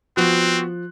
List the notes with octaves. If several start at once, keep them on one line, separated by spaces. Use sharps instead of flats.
F3 B3 C4 F#4 F#6